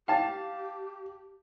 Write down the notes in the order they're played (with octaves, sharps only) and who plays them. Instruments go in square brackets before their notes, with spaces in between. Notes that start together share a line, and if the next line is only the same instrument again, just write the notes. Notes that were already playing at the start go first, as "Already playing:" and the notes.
[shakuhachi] G4 [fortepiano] F5 A5 [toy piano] G5